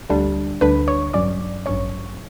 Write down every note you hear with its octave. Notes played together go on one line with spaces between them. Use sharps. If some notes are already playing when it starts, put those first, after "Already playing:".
D2 D3 G3 D4
D2 D3 G3 D4 B4 B5
C#5 C#6
A1 G2 F#3 C#4 D5 D6
A1 G2 F#3 C#4 C#5 C#6